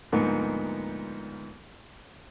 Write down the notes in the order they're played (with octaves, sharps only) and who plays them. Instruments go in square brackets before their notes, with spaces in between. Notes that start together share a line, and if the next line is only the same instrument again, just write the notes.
[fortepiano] D2 G#2 F3 A#3 B3